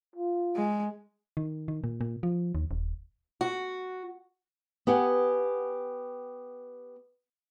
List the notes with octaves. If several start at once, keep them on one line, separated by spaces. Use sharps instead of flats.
F4
G#3
D#3
D#3
A#2
A#2
F3
D#2
D#1
F#4
B3 G4 F#5 G#5